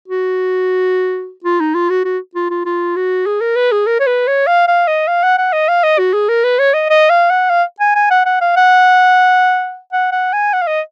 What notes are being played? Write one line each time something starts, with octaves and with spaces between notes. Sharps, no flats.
F#4
F4
D#4
F4
F#4
F#4
F4
F4
F4
F#4
G#4
A#4
B4
G#4
A#4
C#5
B4
C#5
F5
F5
D#5
F5
F#5
F#5
D#5
F5
D#5
F#4
G#4
A#4
B4
C#5
D#5
D#5
F5
F#5
F5
G#5
G#5
F#5
F#5
F5
F#5
F#5
F#5
G#5
F#5
F5
D#5